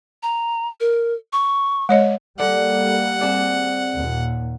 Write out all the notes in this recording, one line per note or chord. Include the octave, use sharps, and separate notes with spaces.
A#5
A#4
C#6
G#3 C#5 D#5
G3 A#3 A4 D5 F#5
C4 G#4 D5
D#2 A#2